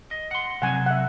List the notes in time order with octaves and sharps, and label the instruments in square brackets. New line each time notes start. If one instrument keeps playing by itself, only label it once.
[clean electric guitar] D#5
F#5 C6
[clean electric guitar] C3 F#3 C4 [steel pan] F#5 G#5
[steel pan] E5 F#5